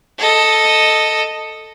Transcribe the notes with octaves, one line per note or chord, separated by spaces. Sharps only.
A4 D#5